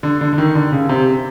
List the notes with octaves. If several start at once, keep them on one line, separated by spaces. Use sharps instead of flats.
D3
D3
D3
D#3
D3
C#3
C3